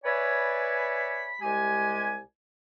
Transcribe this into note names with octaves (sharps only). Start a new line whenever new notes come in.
B4 C#5 D5 E5 G#5 B5
C2 G#3 G4 G#5